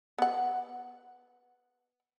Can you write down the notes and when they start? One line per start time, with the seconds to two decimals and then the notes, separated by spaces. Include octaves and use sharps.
0.18 B3 F#5